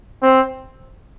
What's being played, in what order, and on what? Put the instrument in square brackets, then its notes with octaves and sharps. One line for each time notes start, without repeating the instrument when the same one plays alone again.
[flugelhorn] C4